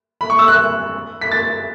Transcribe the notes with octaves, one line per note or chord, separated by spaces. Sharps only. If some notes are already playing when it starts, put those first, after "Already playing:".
B5
C#6
E6
F#6
B6
A6